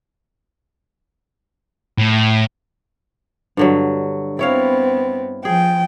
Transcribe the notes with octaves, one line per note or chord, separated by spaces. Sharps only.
A2
G2 D3 F#3
B3 C4 E4 C#5 F5
F3 G#4 G5